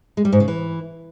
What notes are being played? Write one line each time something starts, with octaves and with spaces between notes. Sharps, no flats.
G#3
G3
G#2
C#3
E3